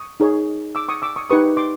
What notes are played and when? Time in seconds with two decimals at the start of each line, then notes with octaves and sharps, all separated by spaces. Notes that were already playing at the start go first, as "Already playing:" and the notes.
Already playing: C#6 D#6
0.20 D#4 G#4 C#5
0.75 D6 E6
0.89 C#6 D#6
1.02 D6 E6
1.16 C#6 D#6
1.30 D#4 G4 B4 C#6 D#6
1.57 C6 D6